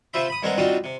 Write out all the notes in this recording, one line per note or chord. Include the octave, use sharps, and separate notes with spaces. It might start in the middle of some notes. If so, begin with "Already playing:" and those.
C3 F4 C5 E5 B5
B5 D#6
G2 G#3 C4 A#4 F#5
G3 C4 D4 D#4 F4 F#4
C3